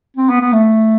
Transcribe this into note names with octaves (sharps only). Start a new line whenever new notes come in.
C4
B3
B3
A3